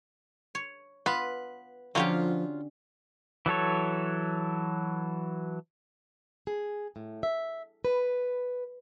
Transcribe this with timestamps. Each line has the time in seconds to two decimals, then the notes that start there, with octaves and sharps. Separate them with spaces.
0.55 C#5
1.06 B3 F4 B4
1.95 D3 F3 F#3 C#4 F4 G4
3.46 E3 F#3 A4 C#5
6.47 G#4
6.96 A2
7.23 E5
7.85 B4